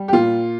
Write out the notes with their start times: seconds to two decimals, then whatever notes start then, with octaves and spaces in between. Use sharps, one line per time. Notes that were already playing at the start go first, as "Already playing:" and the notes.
Already playing: G3
0.08 G4
0.13 A#2 F4